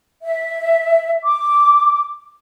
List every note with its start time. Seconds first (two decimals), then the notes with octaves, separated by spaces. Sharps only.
0.23 E5
1.23 D6